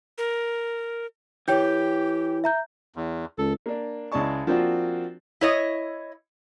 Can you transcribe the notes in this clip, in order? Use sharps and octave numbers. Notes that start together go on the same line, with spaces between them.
A#4
E3 G4 C#5 G5 G6
E5 A#5 G6
E2
C#2 A4
A#3 D4
C#2 G#3 E4 D5 A5 C#6
F3 A#3 C4 D4 F4 F#4
E4 C#5 D#5